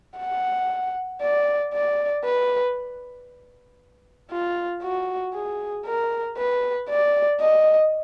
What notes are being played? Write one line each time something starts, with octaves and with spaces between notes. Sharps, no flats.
F#5
D5
D5
B4
F4
F#4
G#4
A#4
B4
D5
D#5